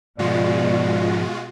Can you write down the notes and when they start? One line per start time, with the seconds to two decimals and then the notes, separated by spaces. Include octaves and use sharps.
0.19 G#2 B2 F3 G#3 F4 F#4 D5